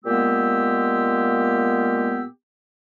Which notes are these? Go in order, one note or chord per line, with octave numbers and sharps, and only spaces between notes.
A#2 G#3 A#3 B3 G4 E6